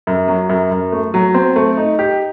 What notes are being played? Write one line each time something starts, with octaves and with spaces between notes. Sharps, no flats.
F#2
F#3
F#2
F#2
A3
F#3
C4
A3
D#4
G4